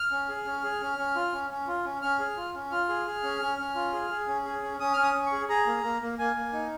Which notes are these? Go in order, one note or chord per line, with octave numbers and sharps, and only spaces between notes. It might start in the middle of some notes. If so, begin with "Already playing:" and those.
Already playing: F6
C#4
G#4
C#4
G#4
C#4
C#4
F4
C#4
C#4
F4
C#4
C#4 F6
G#4
F4
C#4
F4 F6
G#4
G#4
C#4
C#4
C#4
F4
G#4
G#4
C#4
G#4
C#4
C#4 D#6
C#4 F6
D#6
C#4
C#6
G#4
G#4 A#5
A#3
A#3
A#3
A#3 G#5
A#3
D#4